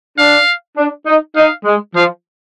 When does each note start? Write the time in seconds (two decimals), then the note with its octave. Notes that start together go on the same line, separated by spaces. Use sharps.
0.18 D4 F5
0.77 D4
1.07 D#4
1.36 D#4 F5
1.65 G#3
1.96 F3 F5